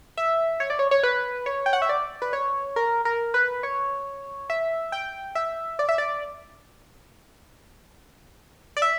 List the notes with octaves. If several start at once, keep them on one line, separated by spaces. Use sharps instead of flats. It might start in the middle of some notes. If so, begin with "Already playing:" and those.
E5
C#5
D5
C#5
C#5
B4
C#5
G5
F#5
E5
D5
B4
C#5
A#4
A#4
B4
C#5
E5
G5
E5
D5
E5
D5
D5
E5